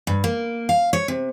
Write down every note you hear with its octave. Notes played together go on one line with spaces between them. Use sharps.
G2
A#3
F5
C#5
C3